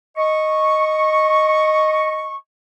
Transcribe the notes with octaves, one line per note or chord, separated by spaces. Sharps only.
D#5 C#6